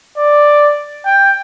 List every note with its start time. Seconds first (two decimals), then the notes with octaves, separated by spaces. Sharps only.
0.17 D5
1.05 G5